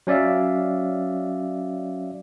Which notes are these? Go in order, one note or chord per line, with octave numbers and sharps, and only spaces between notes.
F#3 C#4 D5 E5 F5